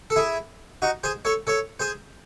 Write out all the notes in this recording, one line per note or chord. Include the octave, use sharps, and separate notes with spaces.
A4
E4 G#4
D#4 F#4
G#4 C5
A4 C#5
A4 C#5
G#4 C5